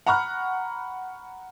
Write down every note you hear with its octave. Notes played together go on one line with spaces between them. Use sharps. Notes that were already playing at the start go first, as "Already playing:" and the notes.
F#5 A#5 B5 C#6 F6 F#6